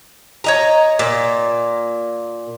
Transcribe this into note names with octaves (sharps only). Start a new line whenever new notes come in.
C#5 D#5 A#5
A#2